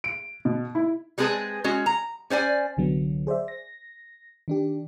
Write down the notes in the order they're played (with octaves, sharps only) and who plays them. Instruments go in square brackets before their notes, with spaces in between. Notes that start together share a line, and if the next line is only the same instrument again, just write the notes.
[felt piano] D7
B2
E4
[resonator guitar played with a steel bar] G3 G#3 C4 G#4 B4 A5
G#3 C#4 F#4
A#5
C#4 C5 D5 G#5
[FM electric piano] C2 D3 F#3 B3
G#4 C5 D5 E5
A#6
D#3 D4 G4